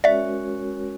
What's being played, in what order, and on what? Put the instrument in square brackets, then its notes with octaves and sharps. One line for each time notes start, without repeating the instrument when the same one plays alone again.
[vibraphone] G#3 C#4 F#4 A#4 C#5 [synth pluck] D5 E5